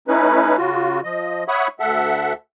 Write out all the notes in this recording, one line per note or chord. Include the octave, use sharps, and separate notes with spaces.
A3 C#4 D#4 E4 B4
C#3 F4 F#4
F3 D#5
C#5 E5 F#5 B5 C#6 D#6
D2 A4 E5 F#5